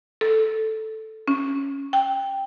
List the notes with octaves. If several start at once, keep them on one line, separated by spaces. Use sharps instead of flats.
A4
C#4
G5